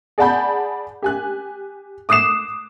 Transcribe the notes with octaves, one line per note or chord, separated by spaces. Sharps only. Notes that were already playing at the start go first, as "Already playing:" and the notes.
G#4 D5 F#5 A5 B5 G6
G4 G#5 F#6
D6 D#6 F#6 C7 E7